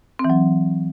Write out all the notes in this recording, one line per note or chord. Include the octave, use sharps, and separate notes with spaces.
C4
E3
F#3